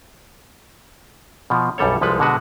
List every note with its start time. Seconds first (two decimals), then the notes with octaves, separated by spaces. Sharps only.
1.50 B2 F3
1.78 B1 F#2 G3 A4 C#5
2.01 C2 F3 G#3 A4 B4
2.19 B2 D3 G#3 F#4 B4